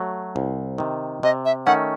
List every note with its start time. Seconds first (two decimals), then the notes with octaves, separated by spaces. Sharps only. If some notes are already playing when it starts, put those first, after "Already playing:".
Already playing: F#3 A3
0.36 C2
0.78 C3 D#3
1.23 C3 D#5
1.45 E5
1.66 D#3 A3 C#4 F#5